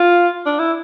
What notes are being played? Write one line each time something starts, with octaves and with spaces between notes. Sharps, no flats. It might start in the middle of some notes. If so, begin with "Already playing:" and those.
Already playing: F4
D4
E4